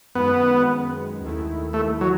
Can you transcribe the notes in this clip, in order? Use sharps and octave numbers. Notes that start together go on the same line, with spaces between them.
F#2 D#3 G#3 B3
D#2 D#3 A3 E4
A3
F#3